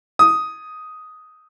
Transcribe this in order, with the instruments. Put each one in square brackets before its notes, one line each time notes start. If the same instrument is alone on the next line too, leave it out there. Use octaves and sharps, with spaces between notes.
[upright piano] D#6